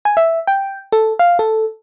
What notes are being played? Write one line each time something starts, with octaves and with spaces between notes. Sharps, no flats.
G#5
E5
G5
A4
F5
A4